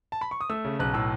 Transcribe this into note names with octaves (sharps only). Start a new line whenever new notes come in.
A5
B5
C#6
D#6
A3 E6
C#3
B1 F#6
A2 E6